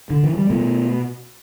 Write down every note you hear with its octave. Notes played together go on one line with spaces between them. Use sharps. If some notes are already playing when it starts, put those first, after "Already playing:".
D3
E3
G3
B2 A3